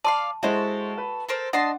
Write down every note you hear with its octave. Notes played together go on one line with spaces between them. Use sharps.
D5 F5 A5 C6
G#3 E4 F#4 A4 C5
B4
A4 A#4 C5
D4 D#5 F#5 A5 C6